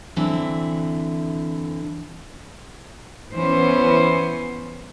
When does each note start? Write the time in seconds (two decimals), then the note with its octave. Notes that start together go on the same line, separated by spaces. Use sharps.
0.16 D3 E3 C4 E4
3.33 E3 B3 C#4 C5